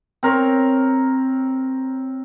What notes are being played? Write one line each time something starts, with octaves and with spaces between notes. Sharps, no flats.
C4 A#4 C#5